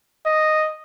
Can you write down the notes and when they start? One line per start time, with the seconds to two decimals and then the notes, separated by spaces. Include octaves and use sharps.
0.26 D#5